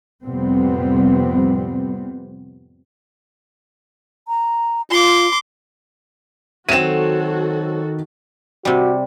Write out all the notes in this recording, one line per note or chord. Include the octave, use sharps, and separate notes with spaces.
F2 A2 C3 G3 B3 C4
A#5
F4 C6 D6
D#3 F#3 C4 F#4 A4 D#7 E7
C3 G3 F#4